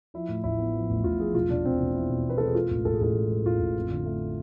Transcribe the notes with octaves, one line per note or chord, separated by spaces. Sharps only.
F3 E4
A2
A1 E4
B3
F3
A1
A1 F4
F3 G#4
E1 F4
E1 D4
E1 C4
E1
E2 E4
B2
E2 B4
E1 A4
G#4
G#3 F4
A1
A1 A4
G#4
A1 A4
G#3
G#3
A1 F4
A1
F2
D3
A3